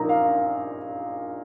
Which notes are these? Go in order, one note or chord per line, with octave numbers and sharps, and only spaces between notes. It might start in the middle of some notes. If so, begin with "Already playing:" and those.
Already playing: A#1 A#2 A#3 D#4 A#5
F5